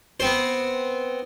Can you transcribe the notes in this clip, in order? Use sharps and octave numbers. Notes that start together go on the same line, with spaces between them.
B3 C4 C5